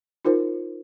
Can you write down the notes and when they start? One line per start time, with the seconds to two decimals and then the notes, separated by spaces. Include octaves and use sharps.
0.25 D#4 F4 A#4 C5